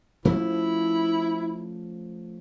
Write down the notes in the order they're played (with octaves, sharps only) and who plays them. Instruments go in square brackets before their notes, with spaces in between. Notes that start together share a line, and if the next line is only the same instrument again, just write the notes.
[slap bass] F3 A3 C#4 [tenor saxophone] E4